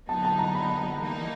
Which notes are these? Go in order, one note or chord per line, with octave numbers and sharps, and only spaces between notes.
D3 F#3 B3 D#4 A5
A5
A#5
B5
A#5
E3 G3 A#3 D#4